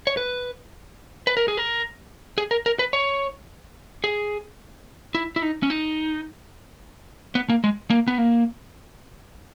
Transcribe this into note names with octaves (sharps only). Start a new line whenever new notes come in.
C#5
B4
B4
A#4
G#4
A#4
G#4
A#4
A#4
B4
C#5
G#4
E4
E4
D#4
C#4
D#4
B3
A#3
G#3
A#3
B3
A#3